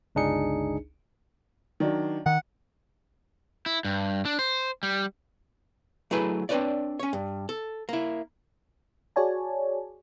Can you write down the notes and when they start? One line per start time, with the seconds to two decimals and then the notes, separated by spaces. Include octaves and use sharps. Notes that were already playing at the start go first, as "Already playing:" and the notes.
0.15 G1 C#2 D4 D#4 G#4 C#7
1.80 D#3 F#3 D4
2.26 D#3 F#5
3.66 E4
3.85 G2
4.25 D4
4.39 C5
4.83 G3
6.11 F#3 A3 E4 G#4 B4
6.49 C4 D4 F4 B4 C#5 D5
6.99 C#4 C#5
7.13 G2
7.49 A4
7.89 A#3 E4
9.16 F#4 G#4 C#5 D5 G#5 A5